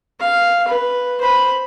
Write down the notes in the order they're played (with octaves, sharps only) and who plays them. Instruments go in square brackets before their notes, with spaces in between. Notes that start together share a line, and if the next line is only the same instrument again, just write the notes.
[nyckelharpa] F5
B4
C5 B5